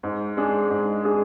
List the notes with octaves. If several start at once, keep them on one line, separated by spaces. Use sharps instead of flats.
G#2
G#3 D4 G#4
G#2
G#3 D4 G#4